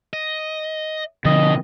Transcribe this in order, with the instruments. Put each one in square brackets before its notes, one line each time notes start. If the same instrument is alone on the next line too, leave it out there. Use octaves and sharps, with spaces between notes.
[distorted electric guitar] D#5
[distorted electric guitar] B2 [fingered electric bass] D3 F3 [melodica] D#5